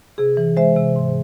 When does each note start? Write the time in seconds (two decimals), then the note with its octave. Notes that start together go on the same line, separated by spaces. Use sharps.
0.18 C3 G#4
0.37 E3
0.57 G#3 C5 E5
0.76 C3
0.96 G#2